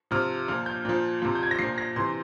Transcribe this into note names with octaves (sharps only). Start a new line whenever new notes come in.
C3 F3 F6
A#2 F3 F6
G6
A#2 F3
C3 F3
G6
G#6
A#6
A#2 F3 C7
A#6
C3 E3 C6